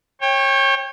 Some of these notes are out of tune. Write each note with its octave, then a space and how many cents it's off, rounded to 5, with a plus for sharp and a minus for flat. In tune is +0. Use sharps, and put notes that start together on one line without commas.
C#5 -25 G5 +20